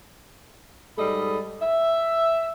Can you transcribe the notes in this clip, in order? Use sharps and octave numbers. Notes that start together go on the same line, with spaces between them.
G#2 G3 A4 D#5 B5
E5